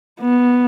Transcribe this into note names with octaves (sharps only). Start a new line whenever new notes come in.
B3